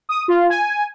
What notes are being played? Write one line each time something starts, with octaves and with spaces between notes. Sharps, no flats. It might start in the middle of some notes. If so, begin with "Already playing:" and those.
D#6
F4
G#5